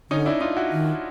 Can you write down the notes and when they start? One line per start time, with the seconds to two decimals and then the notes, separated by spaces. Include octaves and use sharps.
0.10 D3 C#4 D#4
0.26 D4 E4
0.41 D#4 F4
0.56 E4 F#4
0.72 D#3